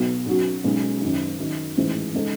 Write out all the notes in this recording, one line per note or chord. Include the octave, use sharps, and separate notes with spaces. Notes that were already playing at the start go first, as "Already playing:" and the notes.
Already playing: B1 B2 F#3
B1 B2 F#3 C#4 F#4
B1 B2 G#3 C#4
F#1 F#2 D#3
F#1 F#2 D#3
A1 G#2 E3 G#3
C#3 G#3 D#4 A4